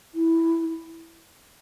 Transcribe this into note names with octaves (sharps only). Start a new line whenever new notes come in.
E4